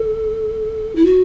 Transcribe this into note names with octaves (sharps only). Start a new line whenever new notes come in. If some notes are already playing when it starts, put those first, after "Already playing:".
Already playing: A4
E4
F#4